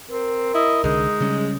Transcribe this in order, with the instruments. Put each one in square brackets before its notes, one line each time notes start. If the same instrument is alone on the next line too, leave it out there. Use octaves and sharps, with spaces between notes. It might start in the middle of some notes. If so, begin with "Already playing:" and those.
[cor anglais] C4 [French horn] A#4
[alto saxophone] E4 [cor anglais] D#5
[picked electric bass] C2 D3 [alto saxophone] G#3 [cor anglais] D#4
[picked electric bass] C#3 G3 C#4